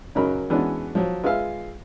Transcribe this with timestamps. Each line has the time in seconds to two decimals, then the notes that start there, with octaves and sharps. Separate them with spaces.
0.15 F#2 C#3 F#3 D#4 A#4 B5
0.50 E3 G#3 B3 C#4 D4 F#4
0.95 F3 F#3
1.24 G#3 F4 B4 E5 F5